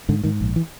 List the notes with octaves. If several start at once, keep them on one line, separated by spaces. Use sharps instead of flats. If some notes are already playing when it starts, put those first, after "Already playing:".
G#2 D3
G#2 D#3
A#1
E3